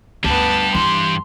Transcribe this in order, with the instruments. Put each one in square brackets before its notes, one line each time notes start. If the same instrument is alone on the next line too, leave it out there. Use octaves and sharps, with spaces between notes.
[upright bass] D2 [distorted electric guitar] G2 G4 [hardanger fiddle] B3 A5
[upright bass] E3 [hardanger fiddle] C6